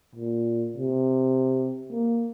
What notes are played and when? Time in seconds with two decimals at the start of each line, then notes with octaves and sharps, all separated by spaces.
0.15 A#2
0.77 C3
1.91 A#3